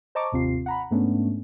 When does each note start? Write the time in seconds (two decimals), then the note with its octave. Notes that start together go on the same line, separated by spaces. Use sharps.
0.15 C5 D#5 A5 A#5 C#6 D6
0.32 G1 D#2 C3 C4 F4 C7
0.66 F#5 A#5 B5
0.91 G#2 A3 B3 C#4 D4